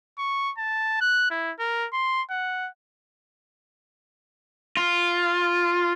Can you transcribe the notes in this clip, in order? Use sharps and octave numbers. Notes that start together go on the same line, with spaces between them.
C#6
A5
F#6
E4
A#4
C6
F#5
F4